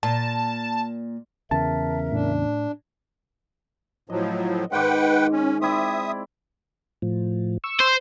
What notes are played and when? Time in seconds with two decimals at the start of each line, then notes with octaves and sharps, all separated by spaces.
0.03 A#2 A5
1.51 E2 C#3 A#4 E5 A5
2.12 A2 D4
4.10 A2 F3 F#3 D#5
4.72 G#2 D#3 B4 F#5 G5 D6
5.32 C#4
5.61 C4 E4 D5 E5 D#6
7.02 A2 F3
7.64 C#6 E6
7.80 C5